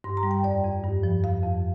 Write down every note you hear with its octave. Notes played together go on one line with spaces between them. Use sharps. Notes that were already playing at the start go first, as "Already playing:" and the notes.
G2 C6
A#5
G3
G5
F2 D5
F2
G2
F3
F2 F5
F2